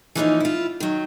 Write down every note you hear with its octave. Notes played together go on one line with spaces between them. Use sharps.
E3 F3 A#3 B3 C#4 D#4
E4 F4
D#3 F#3